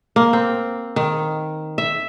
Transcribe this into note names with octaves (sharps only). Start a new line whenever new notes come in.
A#3
C4
D#3
E5